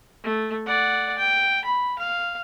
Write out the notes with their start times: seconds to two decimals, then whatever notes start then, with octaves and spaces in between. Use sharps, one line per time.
0.23 A3
0.67 D5 F#5
1.18 G5
1.65 B5
1.99 F5